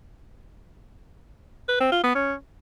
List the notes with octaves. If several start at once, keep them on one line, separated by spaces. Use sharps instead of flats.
B4
C4
F4
B3
C#4